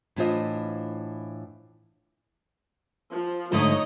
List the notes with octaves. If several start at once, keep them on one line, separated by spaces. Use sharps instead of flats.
A2 E3 D4 F4 C5 D#5
F3
G#2 D3 A3 D#4 C#5 D#5